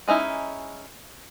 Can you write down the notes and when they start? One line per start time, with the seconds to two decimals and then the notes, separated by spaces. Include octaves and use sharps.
0.08 G#3 C#4 D#4 E4